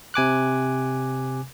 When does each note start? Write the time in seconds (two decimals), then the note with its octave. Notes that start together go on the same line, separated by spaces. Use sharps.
0.14 C3 G#5 D6 F#6